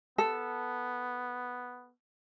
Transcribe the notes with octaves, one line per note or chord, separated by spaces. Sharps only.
B3 A4